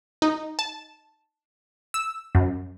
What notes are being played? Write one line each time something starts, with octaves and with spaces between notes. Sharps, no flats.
D#4
A5
E6
F#2